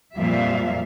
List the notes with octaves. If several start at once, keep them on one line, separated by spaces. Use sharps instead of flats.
F2 A#2 F3 G3 E5 F5